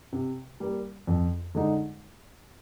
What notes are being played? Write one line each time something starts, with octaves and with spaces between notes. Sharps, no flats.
C3
G3 A#3
F2
D3 G#3 D#4